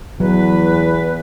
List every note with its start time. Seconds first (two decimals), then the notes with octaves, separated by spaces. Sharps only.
0.20 E2 F#3 B4